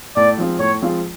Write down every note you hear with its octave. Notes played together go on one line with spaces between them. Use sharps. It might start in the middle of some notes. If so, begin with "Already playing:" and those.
A2 D5
F3 G#3 C4 F4
A2 C#5
F3 G#3 C4 F4